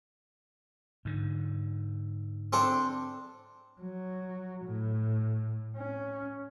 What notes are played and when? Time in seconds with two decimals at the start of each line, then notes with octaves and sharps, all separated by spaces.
1.05 G#2 D3
2.53 C4 D4 A4
3.81 F#3
4.66 A2
5.77 C#4